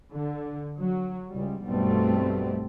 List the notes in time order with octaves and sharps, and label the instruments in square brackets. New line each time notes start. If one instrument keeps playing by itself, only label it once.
[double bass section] D3
F#3
C#2 G3
B1 G2 B2 G3 A3 C4